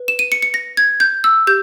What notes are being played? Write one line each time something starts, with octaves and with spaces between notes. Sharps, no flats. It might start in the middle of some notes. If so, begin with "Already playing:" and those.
Already playing: B4
E7
D#7
C#7
C#7
A#6
G#6
G6
E6
G4 G6